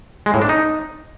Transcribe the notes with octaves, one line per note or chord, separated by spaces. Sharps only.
G#3
A2
D4
D#4